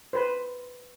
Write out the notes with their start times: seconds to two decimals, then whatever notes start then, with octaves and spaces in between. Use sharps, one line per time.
0.13 B4 C5